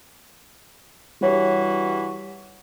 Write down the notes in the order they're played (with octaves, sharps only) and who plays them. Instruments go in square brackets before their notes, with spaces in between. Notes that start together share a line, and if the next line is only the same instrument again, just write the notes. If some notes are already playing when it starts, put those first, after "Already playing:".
[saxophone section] G2 E3 F#4 [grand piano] G3 C#5